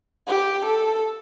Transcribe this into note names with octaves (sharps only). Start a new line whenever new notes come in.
G4
A4